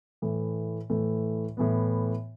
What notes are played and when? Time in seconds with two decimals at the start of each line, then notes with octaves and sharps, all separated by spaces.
0.22 A2 E3 A3
0.90 A2 E3 A3
1.57 A2 E3 B3